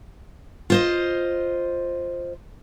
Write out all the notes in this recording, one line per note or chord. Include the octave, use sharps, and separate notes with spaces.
F4 C5 D#5